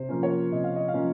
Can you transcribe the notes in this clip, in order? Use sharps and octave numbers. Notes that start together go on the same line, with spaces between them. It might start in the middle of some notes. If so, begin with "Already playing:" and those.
Already playing: C3 C5
F3 A#3 C#4
A#4 C#5
C3 D#5
F5
D#5
F5
F3 A#3 C#4